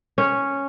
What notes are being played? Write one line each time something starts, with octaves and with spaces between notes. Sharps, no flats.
C#4